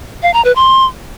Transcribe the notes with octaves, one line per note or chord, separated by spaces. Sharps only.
F5
A#5
B4
C6